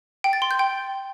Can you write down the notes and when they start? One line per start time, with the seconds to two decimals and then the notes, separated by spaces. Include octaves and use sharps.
0.24 G5
0.33 A6
0.42 C6
0.51 G6
0.59 G5